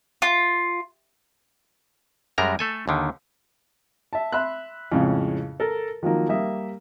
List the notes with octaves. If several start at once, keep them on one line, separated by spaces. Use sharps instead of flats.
F4
F#2 G3 G#3 A#4 A#5
A3 A4 G#5
D#2 D3 D#3
E5 A5
E5 B5 C6 E6 F#6
F2 A2 C#3 G#3
A4 A#4
D#3 F3 F#3 A#3
G3 A#3 E5 D#6